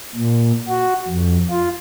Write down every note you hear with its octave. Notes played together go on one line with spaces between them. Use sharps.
A#2
F#4
F2
F4